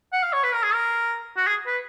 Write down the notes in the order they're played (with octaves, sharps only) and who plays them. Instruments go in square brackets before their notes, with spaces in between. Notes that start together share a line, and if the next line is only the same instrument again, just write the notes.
[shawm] F#5
F5
C#5
B4
A#4
G#4
A#4
F#4
G#4
B4